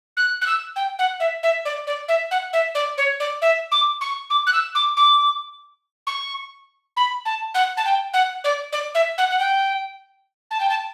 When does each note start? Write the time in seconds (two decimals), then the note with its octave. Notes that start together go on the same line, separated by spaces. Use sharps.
0.16 F#6
0.41 F#6
0.46 E6
0.76 G5
0.98 F#5
1.20 E5
1.43 E5
1.65 D5
1.87 D5
2.08 E5
2.31 F#5
2.53 E5
2.74 D5
2.97 C#5
3.20 D5
3.41 E5
3.71 D6
4.01 C#6
4.30 D6
4.46 F#6
4.52 E6
4.75 D6
4.96 D6
6.06 C#6
6.96 B5
7.25 A5
7.54 F#5
7.77 A5
7.85 G5
8.13 F#5
8.44 D5
8.72 D5
8.94 E5
9.17 F#5
9.30 F#5
9.39 G5
10.50 A5
10.60 G5
10.69 A5